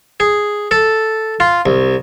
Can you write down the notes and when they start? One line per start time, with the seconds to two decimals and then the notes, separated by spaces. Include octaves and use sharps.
0.20 G#4
0.71 A4
1.40 F4
1.66 C2